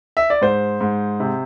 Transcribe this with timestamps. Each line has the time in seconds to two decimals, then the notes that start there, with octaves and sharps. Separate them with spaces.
0.17 E5
0.30 D5
0.41 G#2 C5
0.81 G#2
1.20 C3